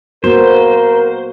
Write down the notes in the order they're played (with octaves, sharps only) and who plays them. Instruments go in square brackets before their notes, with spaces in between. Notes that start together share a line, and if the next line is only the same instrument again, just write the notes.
[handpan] A#3 B3 F#4 [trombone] A#4 [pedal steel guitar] C5